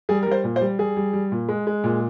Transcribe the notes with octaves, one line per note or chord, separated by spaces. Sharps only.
G3 G#4
G3 A#4
C5
A#2
C5
G3
G3 G#4
G3
G3
A#2
G#3
G#3
A#2